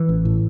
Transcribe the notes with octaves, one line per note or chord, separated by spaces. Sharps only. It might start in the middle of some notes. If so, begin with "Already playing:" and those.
Already playing: E3
A1
A2